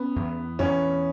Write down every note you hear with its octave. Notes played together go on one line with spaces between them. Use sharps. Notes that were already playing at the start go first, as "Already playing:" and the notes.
Already playing: B3 C#4
E2
E2 C#4